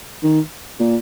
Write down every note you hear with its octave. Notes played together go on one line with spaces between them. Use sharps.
D#3
A#2